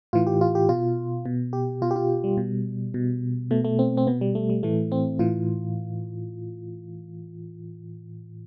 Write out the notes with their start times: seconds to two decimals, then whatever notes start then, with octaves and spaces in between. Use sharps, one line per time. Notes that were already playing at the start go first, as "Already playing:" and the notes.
0.13 A2 E3 F4
0.27 G4
0.41 F4
0.55 G4
0.69 B2 F4
1.26 B2
1.53 G4
1.82 B2 F4
1.91 G4
1.96 F4
2.24 G3
2.37 B2
2.94 B2
3.51 B2 A3
3.65 A3
3.79 C4
3.97 C4
4.07 B2 B3
4.21 G3
4.35 A3
4.50 G3
4.63 A2 E3 A3
4.92 C4
5.19 A2 E3 F4